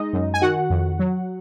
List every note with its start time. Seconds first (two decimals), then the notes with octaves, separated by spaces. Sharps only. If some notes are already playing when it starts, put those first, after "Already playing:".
Already playing: G#3 D#4 D#5
0.13 F#2
0.34 G#5
0.42 D#3 F#4 F#5
0.70 F2
0.99 F#3